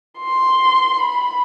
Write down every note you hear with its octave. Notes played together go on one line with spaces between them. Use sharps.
C6
B5